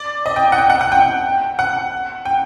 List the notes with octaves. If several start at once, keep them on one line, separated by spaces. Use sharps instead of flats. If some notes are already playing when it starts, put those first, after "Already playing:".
Already playing: D5
D#5
G5
F#5
G5
F#5
F#5
G5
F#5
G5